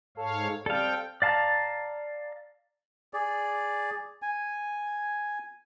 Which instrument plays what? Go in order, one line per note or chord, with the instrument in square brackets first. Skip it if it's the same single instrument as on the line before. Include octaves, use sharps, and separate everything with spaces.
[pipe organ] G#2 C#5 F5 [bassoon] A4
[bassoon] G3 [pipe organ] C4 G5 [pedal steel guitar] A4 F5
[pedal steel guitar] D5 F5 A5 A#5
[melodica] G#4 D5
G#5